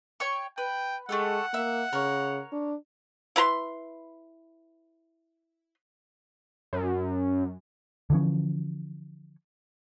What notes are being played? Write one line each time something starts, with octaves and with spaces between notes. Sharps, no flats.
C#5 G5 C#6
B4 G5
G#3 A3 G4 A4 F#5
A#3 E5 E6
C#3 A#4 C#5
D4
E4 B4 A#5 C6
F#2
D3 E3 F3 C#4